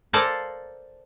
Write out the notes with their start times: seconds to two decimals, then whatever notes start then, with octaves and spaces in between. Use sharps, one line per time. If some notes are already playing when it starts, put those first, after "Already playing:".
0.13 A4 A#4 C5 D5 F5 G#5